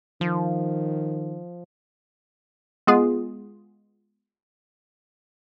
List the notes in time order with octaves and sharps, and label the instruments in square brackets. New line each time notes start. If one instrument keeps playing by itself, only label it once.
[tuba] D#3 [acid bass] F3
[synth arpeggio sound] G#3 B3 F4 G#4